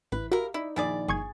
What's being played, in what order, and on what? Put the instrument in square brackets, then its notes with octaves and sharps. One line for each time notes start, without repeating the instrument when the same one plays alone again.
[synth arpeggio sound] A1 [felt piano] E3 [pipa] B4
[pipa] E4 A#4 [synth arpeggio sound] F#4 [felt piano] G4 F5
[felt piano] D#4 D5 [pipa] E4
[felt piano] A#1 D#3 A6 [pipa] E4 G#4 D5
[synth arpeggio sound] G1 C#6 G#6 [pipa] G#4